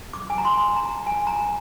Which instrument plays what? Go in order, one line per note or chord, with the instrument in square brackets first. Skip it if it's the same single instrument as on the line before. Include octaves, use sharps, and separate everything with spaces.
[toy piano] D6
G#5
A#5
C6
A#5
G#5
A#5